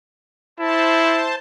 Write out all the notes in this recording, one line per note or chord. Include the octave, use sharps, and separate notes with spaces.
E4 C5 A5